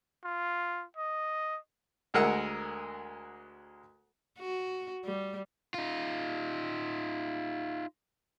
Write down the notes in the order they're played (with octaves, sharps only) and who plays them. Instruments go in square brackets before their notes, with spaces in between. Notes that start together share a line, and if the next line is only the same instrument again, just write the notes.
[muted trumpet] F4
D#5
[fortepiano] D2 G#3 A#4 F#5 E6
[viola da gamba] F#4
G3
[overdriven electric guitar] D#4 F4